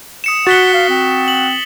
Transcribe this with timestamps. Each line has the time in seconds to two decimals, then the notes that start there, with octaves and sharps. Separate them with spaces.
0.24 D#6 C#7 E7
0.47 F#4 F#5 A6 B6 G7
0.74 F5
0.90 C4
1.28 F#7